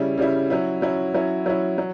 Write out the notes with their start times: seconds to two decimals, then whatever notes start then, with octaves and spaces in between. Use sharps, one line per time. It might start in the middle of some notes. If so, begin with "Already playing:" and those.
Already playing: C#3 G3 C#4 E4
0.18 C#3 G3 C#4 E4
0.50 F#3 C#4 E4
0.82 F#3 C#4 E4
1.14 F#3 C#4 E4
1.46 F#3 C#4 E4
1.78 F#3